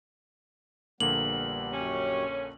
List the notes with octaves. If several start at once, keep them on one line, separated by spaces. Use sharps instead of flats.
A#1 D3 G3 A#3 B3 F#7
F#2 C#4 G4 C#5